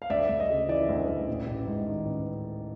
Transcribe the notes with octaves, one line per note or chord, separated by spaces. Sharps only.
F5
D2 D5 E5
D2
D#5
C#3
E3 D5
D2
D2
A1
A1
G#2
D#3
A1